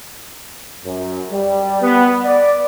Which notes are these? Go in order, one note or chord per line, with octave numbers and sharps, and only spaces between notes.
F#2
G3
B3
D5